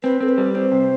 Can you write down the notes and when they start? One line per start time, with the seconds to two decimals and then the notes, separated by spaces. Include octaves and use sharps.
0.03 C4 B4
0.20 C4 A4
0.29 B4
0.38 G3
0.55 C4 C5
0.72 C3